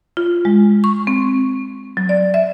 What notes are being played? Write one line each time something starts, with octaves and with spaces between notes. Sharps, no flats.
F4
G#3
C#6
C4
F#3
D5
E5